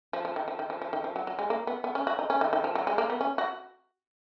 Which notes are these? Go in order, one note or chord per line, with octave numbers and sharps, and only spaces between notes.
F3
F3
D#3
F3
D#3
F3
F3
D#3
F3
F#3
F#3
G#3
A#3
B3
B3
C#4
F#4
D#4
C#4
D#3
D#3
F3
F#3
G#3
A#3
B3
C#4
F#4